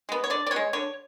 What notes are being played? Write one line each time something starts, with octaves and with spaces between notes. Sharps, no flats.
G#3 B3
C#5
D3 D5
D5
B3 C#5
G#3
D3 C#5